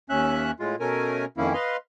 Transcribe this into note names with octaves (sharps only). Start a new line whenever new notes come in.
D#2 C#4 E5 F#6
A2 G#3 F4
B2 A3 C#4 A#4 G#5
F2 D#3 A#3 C#4 E4
B4 D#5 F5 C6